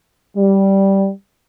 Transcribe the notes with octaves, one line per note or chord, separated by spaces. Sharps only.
G3